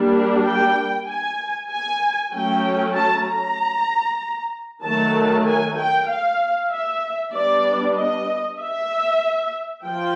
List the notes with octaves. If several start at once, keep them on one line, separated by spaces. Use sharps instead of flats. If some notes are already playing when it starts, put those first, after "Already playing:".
Already playing: G3 A#3 D4
G5
G#5
G#5
F#3 A3 C#4 G5
A5
A#5
D#3 F#3 A3 A5
G#5
G5
F5
E5
G3 B3 D4 D5
D#5
E5
F3 G5